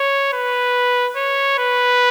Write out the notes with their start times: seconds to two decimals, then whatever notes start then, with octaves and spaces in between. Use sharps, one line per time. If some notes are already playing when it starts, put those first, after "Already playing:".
Already playing: C#5
0.33 B4
1.16 C#5
1.59 B4